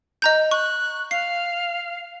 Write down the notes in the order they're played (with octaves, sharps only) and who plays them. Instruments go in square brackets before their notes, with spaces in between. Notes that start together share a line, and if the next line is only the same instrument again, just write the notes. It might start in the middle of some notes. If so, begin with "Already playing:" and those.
[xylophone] D#5 A#5 G6
[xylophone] C#6 [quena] F#6
[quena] F5 [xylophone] C7